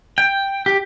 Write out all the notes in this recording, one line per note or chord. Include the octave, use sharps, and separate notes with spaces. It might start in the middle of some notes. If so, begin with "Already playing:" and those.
G5
G4